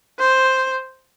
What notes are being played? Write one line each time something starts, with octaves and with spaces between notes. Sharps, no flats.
C5